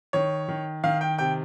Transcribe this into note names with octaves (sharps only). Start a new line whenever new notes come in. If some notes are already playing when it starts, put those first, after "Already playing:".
D#3 C#5
D#3
D#3 F5
G5
C3 G5